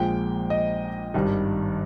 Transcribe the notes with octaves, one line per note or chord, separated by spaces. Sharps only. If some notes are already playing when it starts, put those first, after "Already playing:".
Already playing: A#1 A#2 G#3 G5
D#5
G#1 G2 D#3 G3